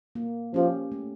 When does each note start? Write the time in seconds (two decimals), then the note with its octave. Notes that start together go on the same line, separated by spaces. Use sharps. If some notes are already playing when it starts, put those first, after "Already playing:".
0.15 A#3
0.54 F3 C#4 G4
0.92 A3